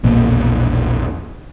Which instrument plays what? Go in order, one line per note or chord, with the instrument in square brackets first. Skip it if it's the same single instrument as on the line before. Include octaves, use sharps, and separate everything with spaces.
[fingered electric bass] A#1 E2 B2 A#3